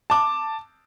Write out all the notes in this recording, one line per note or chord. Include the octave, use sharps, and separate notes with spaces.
A5 D6